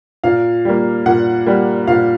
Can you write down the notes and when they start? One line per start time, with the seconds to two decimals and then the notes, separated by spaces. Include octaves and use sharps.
0.24 A#2 F5
0.65 G3 A#3
1.06 A#2 F#5
1.46 G3 A#3
1.87 A#2 F5